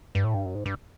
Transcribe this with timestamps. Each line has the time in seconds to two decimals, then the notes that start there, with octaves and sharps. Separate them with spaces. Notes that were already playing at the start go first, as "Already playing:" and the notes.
0.15 G2
0.24 A2
0.34 G2
0.45 F#2
0.55 G#2
0.66 G2